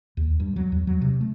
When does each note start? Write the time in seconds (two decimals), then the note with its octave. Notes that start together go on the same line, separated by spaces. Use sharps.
0.17 D#2
0.40 G2
0.56 F#3
0.72 E2
0.87 F#3
1.01 C3
1.21 A3